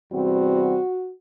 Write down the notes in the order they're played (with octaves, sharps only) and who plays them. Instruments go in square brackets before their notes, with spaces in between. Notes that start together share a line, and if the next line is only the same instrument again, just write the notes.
[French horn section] E2 C3 G3 C4 F#4